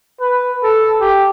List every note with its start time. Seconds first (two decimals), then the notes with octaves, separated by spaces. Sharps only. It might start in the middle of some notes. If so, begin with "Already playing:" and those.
0.20 B4
0.63 A4
1.01 G4